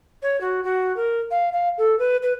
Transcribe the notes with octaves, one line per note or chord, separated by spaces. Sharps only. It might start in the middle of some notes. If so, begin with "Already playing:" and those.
C#5
F#4
F#4
A#4
F5
F5
A4
B4
B4